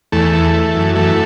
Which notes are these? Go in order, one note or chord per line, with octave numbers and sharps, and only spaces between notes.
E2 A3
E3
E3
F#2
E3 A3